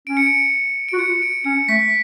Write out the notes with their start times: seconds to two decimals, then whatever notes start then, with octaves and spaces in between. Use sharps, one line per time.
0.07 C#4 D7
0.17 C#7
0.26 D7
0.89 F#4 D7
0.99 F4 C#7
1.22 D7
1.44 C#4 C#7
1.68 A3 B6